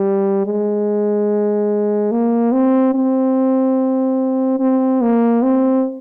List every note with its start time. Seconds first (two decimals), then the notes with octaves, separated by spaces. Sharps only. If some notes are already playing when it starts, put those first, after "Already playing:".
Already playing: G3
0.46 G#3
2.12 A#3
2.52 C4
2.95 C4
4.60 C4
5.01 A#3
5.43 C4